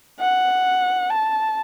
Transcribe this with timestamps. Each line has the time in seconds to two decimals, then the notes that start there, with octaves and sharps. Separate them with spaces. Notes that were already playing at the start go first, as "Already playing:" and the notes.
0.20 F#5
1.10 A5